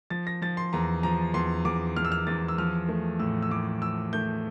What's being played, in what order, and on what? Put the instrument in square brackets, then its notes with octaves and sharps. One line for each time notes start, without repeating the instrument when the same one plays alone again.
[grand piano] F3 A6
A#6
F3 A6
C6
E2 A#5
F3 A#5
E2 C6
E2 D6
E2 F6
E6
F6
E2 A6
E6
F3 F6
A3
A2 E6
E6
A2 D6
F3 E6
A3 G6